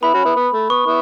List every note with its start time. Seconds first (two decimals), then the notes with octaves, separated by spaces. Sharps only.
0.02 B3 E4 B5
0.14 C#4 F#4
0.25 B3 E4
0.36 B3
0.53 A3
0.69 B3 C#6
0.86 B3 E4